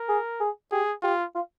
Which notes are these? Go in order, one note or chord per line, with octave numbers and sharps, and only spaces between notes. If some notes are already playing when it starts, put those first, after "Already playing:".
Already playing: A#4
G#4
G#4
G4 G#4
F4 G4
F4